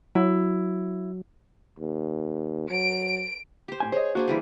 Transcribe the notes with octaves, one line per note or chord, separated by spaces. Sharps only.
F#3 E4
D#2
F#3 D7
G4 C5
A2 C#4 G#5
G#4 C5 C#5 D#5
A#3 D4 F#4 G#4 C5
E3 G3 G#4